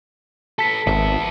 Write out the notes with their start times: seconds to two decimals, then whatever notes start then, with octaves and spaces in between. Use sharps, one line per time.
0.59 A4 B4 A5 B6
0.87 G#1 B3 E5